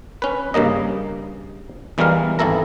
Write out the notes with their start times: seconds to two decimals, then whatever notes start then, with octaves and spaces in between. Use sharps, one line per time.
0.22 C#4 B4
0.54 G2 C#3 A#3 D#5
1.98 E2 E3 G3 G#3 A#4 F5
2.39 G#1 E3 E4 A4 A#5